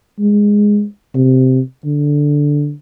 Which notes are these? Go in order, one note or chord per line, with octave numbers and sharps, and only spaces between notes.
G#3
C3
D3